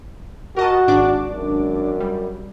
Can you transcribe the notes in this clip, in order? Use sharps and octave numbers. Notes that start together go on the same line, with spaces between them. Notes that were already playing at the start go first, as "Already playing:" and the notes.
F#4 A#4 D#5 A5
G#1 D4 D6
F#2
G3